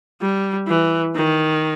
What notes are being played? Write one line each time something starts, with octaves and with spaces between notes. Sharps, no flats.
G3
E3
D#3